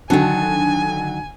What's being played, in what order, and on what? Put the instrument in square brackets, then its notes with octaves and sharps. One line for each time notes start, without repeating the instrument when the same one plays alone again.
[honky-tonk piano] D3 A5 [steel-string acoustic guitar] D#3 F#3 [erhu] G#5